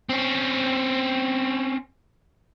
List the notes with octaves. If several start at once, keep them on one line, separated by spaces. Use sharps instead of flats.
C4 C#4